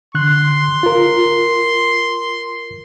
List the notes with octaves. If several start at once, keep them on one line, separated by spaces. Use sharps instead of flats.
D3 C6 F#6
F4 A#4